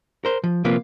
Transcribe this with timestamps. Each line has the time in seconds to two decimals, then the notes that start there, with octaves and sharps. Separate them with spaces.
0.25 A#4 C5
0.44 F3
0.64 C3 F3 A#3 C4 F4 B4